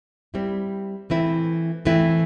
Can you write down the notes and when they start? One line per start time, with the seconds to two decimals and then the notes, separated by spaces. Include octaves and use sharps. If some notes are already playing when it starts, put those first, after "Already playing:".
0.34 G3 C4 E4
1.10 E3 A3 C4 E4
1.85 E3 A3 C4 E4